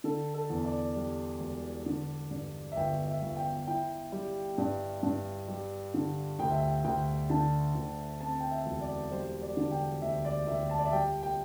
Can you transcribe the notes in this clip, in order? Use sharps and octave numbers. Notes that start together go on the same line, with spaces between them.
D3 A4
A4
E2
D5
G3
E1
D3
G2
E5
G1 G5
E5
G1
G5
E4 G5
G3
G2
G2
G3
D3
D2 G5
E5
G5
D2 G5
D3 A5
D2
C4 A5
G5
E5
E1
D5
G3 C5
D5
D3
G5
D2 E5
D5
D2 E5
A5
D5
E5
G3 G5
G5